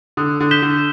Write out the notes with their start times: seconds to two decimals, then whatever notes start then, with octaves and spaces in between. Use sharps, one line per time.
0.17 D3 D#6
0.40 D3
0.51 G6 B6 E7 G7
0.62 D3